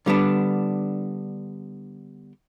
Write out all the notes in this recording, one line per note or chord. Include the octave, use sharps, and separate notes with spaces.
D3 G3 B3 D4